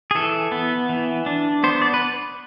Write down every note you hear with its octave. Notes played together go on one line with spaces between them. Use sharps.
G#4
E3 A4
B3
E3
D4
B3 C5
D5
B4